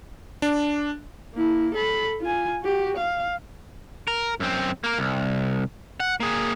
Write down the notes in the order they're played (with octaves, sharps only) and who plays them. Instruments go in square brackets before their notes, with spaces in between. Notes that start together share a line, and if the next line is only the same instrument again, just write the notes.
[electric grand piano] D4
[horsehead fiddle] A#3 E4
A4 B5
F4 G#5
F#4 G4
F5
[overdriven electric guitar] A#4
F#2 C4
A#3 A#4
C2
F#5
A#3 G#4